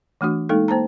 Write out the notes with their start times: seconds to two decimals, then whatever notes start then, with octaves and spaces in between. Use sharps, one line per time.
0.21 E3 A3 D4 F#4
0.49 G#3 A#3 D#4 A4
0.68 A#3 C5 A5 A#5